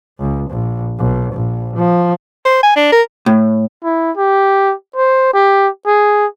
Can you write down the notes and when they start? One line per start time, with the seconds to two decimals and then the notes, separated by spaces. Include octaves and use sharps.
0.19 C#2
0.51 A#1
0.99 B1
1.34 A#1
1.76 F3
2.45 C5
2.63 G#5
2.76 D4
2.92 A#4
3.26 A2
3.84 E4
4.17 G4
4.96 C5
5.34 G4
5.87 G#4